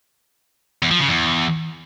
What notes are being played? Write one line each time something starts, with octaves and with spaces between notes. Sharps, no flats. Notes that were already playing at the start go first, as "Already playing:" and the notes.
E2
F3
C#3
E2